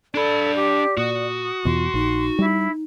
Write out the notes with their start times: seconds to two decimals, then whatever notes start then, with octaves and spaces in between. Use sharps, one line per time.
0.15 D4 A4 D5 B5
0.55 G4
0.97 A#2 F#4 D#6
1.65 E2 B2 F4 C6
1.94 A#1 D#4
2.39 G3 E4